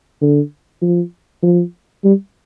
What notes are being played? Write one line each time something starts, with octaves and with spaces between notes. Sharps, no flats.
D3
F3
F3
G3